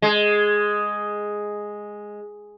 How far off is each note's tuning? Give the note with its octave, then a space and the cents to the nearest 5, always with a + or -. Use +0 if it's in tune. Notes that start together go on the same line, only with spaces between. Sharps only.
G#3 +0